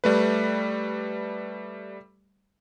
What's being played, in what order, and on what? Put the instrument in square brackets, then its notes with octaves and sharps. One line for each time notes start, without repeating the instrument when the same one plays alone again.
[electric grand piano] G3 A3 B4